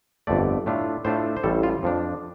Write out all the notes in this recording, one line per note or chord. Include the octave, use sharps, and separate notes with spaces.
G1 F2 D3 A3 D5
A2 A3 D4 F4
A2 A3 D4 F4 C5
C5
A1 A2 G3 A4
F4
F2 F3 D4